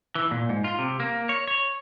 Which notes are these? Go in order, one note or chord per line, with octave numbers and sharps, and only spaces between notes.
E3
A#2
G#2
F4
C3
A#3
C#5
C#5